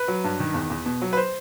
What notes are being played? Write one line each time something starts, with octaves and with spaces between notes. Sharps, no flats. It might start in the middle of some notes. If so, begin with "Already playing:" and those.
Already playing: B4
F#3
G2
D#3
E2
E2
B2
F#3
B4
C5